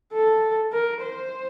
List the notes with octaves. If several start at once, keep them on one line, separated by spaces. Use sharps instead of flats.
A4
A#4
C5